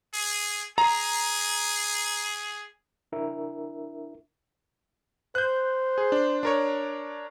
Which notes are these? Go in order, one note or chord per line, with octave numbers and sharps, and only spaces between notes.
G#4
G#4 A#5
D4 E4 A#4 E5
C5 F#6 G6
G#4
D4
D4 A#4 C#5